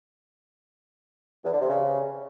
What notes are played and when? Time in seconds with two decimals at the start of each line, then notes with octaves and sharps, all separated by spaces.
1.44 E2
1.52 D3
1.60 C3
1.68 C#3